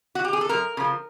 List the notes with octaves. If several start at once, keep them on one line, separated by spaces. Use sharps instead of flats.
F#4
G4
G#4
A4
F#2 A#4
C#3 F3